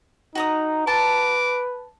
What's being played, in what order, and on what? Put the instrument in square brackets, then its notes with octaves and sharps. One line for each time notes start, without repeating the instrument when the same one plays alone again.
[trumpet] D#4 [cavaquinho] F#4 A#5 D#6
[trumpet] B4 [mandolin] A5 [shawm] D6